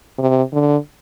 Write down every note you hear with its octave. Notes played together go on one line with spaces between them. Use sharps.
C3
D3